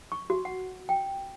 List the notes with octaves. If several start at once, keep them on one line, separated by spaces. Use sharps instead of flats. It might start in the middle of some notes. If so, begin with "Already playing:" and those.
C#6
F#4
F#5
G5